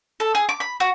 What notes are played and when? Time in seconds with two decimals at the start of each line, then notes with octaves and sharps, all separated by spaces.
0.20 A4
0.35 G#4
0.49 D6
0.60 B5
0.80 F#4